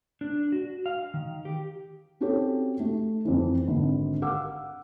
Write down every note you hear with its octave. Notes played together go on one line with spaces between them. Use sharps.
D4
F#4
F5
D#3
G4
C4 C#4 F#4 G4 A4 C#5
A3
F2 E3
G#1 D3
F5 F#5 D6 E6